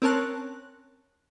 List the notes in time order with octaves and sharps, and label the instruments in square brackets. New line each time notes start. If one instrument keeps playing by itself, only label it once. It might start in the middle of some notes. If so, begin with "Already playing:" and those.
[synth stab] C4 C#4 A#4 C#5 A5 F#6